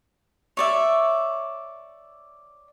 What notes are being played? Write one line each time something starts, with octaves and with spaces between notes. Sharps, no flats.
C#5 D5 E5